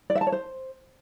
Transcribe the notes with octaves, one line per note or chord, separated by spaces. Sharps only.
D5
E5
A5
C#5
C5